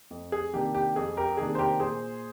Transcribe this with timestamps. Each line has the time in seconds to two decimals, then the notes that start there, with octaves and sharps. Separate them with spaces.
0.11 F2
0.32 G#4
0.53 C3 D#3 A#3 D4 G4
0.75 G4
0.96 F2 G#4
1.17 G4 A#4
1.37 C3 D#3 A#3 D4 G#4
1.55 C5
1.59 G4 A#4
1.80 A#2 G#4 C5